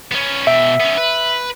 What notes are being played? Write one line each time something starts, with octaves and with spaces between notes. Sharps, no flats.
B3 C#4
B2 E5 G5
B3 C#4
B4